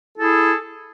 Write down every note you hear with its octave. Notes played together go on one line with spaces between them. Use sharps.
E4 G#4 A4